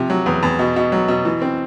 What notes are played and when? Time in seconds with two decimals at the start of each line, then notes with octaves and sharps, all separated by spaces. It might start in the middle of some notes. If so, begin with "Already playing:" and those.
Already playing: C3 F3
0.10 F#3
0.26 E2
0.43 E2
0.59 B2
0.76 B2
0.92 F#3
1.08 B2
1.25 E3
1.42 C4